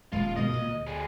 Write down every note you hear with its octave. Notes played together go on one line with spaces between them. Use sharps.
D#1 G#3 F4
B2 D#3 G#3 D#5
A#2
D2
G3 G#4